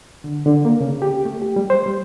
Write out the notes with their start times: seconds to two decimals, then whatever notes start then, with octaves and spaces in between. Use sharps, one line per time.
0.24 D3
0.46 D3
0.65 A#3
0.81 C#3
1.02 G4
1.25 A3
1.42 G4
1.56 G3
1.70 C5
1.86 G3